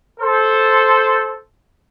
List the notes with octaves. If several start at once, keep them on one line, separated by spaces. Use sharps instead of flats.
A4 C5